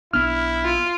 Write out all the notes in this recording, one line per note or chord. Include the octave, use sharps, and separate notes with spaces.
B1 B3 D4 E4 F6
F4